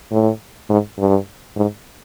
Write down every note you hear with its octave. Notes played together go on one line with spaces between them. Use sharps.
A2
G#2
G2
G#2